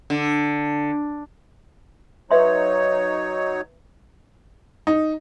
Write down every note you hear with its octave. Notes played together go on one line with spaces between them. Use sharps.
D3
F#3 D#4 B4 C#5 E5 C6
D#4